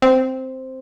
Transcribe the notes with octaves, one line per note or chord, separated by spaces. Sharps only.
C4